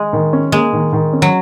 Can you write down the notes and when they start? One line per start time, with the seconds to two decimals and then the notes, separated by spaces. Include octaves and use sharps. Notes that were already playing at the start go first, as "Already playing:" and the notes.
Already playing: G#3
0.13 D#3
0.33 C#4
0.52 G#3 A#3
0.73 D#3
0.93 D#3
1.13 C#4
1.22 F#3